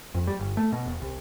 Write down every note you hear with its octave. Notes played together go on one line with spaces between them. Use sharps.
F2
G3
G1
A3
B2
E1
C2